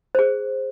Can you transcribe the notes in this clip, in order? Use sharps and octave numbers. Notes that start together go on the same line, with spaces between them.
G#4 C5